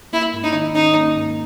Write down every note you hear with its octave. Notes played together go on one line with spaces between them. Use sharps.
A#3 E4
G#2
D#4
D#3
C#4 D#4
A#3
G#2